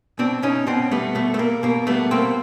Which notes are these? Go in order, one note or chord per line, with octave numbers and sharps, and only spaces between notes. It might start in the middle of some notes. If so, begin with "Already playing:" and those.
B2 C4 D4
B2 C#4 D#4
B2 C4 D4
G3 A3 B3
B2 A3
A3
G3 A#3
B2 A#3
G3 A3 B3
B2 A#3 C4